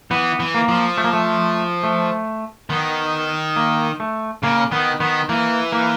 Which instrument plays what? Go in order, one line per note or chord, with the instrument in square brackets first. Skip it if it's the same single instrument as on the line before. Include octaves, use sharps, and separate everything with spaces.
[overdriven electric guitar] E3 [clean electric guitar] B3
[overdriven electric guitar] E3
[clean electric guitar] A#3
[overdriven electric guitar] F3
[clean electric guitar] A3
A#3
A3
A3
[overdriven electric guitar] D#3 [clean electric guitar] B3
[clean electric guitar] A#3
A3
[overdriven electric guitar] C#3 [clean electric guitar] A#3
[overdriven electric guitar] D#3 [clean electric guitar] B3
[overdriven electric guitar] D#3 [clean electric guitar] B3
[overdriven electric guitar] E3 [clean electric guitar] A#3
[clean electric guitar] A#3